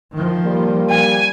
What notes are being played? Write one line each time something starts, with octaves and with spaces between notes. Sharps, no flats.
D#3 F3
G3 A#3
G#5